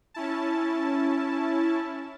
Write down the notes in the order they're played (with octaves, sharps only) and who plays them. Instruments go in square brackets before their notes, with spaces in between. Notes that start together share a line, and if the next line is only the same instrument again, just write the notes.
[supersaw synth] C#4 E4 A5